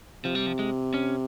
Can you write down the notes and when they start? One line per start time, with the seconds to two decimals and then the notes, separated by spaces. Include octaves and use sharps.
0.25 C3 F3
0.35 G3
0.46 F3
0.59 G#3
0.94 C#4